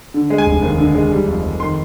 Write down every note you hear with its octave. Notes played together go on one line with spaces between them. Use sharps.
D3
G#3
G#5
F1
D#2
D3
G#3
G3
F2
F2
D#3 C6